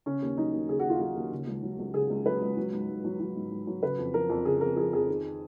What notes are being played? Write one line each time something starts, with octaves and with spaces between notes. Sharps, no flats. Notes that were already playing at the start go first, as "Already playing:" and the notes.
C#3 C#4
D#2
F#3 D#4
D#2
C#3 G#4
D#2 F#4
F4
F#3 F#4
D#2
C#3
C#2
F#3
C#2
C#3 G#4
C#2
F#3 B4
C#2
F#3
G#2
G#2
F#3
F#3
G#2
G#2
F#3
C#3 B4
F2
F3 A#4
F2
C#3 G#4
F2 A#4
F3 G#4
F2 G#4
D#3